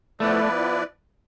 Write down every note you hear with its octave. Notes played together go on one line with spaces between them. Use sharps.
F3 A3 B3 E4 B4 D5